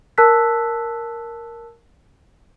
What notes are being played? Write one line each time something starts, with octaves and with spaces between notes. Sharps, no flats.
A#4 A5 E6 F#6 B6